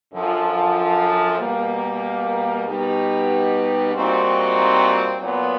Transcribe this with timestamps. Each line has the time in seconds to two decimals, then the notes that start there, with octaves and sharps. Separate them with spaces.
0.12 F#2 D3 F3
1.38 B2 G3 A#3
2.65 B2 G3 B3 D#4 G4
3.91 A#2 G3 C4 D#4 F#4
5.19 A#2 F#3 B3